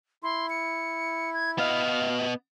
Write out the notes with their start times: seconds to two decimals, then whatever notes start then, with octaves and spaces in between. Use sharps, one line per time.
0.23 E4 C6
0.50 C#7
1.34 G#6
1.58 B3 D#5 F5